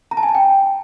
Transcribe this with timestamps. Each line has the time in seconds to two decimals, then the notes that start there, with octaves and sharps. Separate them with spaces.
0.11 A#5
0.17 A5
0.23 G#5
0.29 A5
0.35 G5